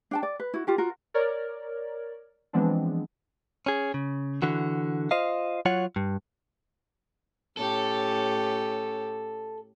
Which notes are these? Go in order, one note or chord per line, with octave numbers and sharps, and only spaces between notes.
D4 G5 A5
D5
B4
E4 F#4
F4 G4 A#4
F4 F#4 A#4
A#4 C#5 D5
E3 F3 G#3 B3 C4 D4
C#4 G#4
C#3
D3 E3 F#4
F4 C5 D#5 F5
F#3 F4 C#5 F#5
G2
A2 C#4 G4 A4